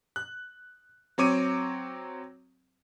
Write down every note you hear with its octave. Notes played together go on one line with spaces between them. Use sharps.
F#6
F#3 C4 C#5 D6 D#7